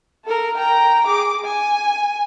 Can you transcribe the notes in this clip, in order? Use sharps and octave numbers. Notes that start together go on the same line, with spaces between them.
A4 A#4
G5 A#5
G#4 D6
G#5